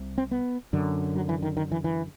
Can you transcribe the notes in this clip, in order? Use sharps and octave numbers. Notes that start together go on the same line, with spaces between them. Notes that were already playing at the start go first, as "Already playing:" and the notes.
Already playing: C2 C3
C4
B3
F#2 D3
F#3
E3
D#3
D#3
E3
E3